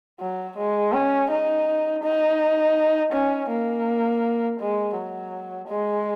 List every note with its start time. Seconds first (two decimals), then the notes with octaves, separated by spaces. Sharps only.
0.20 F#3
0.58 G#3
0.93 C#4
1.31 D#4
2.04 D#4
3.12 C#4
3.50 A#3
4.60 G#3
4.96 F#3
5.69 G#3